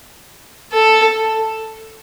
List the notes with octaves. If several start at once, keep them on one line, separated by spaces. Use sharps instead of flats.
A4